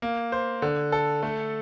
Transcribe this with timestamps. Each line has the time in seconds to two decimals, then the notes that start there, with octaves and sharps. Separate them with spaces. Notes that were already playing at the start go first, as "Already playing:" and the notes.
0.02 A#3
0.32 C5
0.62 D3
0.92 A4
1.23 A3